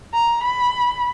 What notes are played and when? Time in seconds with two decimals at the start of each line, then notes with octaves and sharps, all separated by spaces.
0.14 A#5
0.43 B5